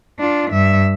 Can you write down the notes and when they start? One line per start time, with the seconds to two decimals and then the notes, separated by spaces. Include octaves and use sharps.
0.19 D4 F4
0.51 G2 E5